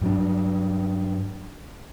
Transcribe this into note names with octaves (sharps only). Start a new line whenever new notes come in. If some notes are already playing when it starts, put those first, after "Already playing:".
G2 F#3 D4